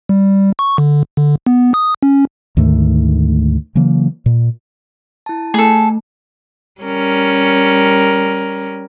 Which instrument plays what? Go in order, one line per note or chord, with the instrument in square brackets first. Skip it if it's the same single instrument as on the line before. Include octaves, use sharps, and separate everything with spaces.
[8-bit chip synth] G3
C#6
D3
D3
B3
D#6
C#4
[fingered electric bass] D2 G#2 D#3 A3
C#3 E3 F#3 A#3
A#2
[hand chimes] E4 A5
[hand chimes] A3 [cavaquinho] G#4 A4
[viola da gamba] G3 C#4 A#4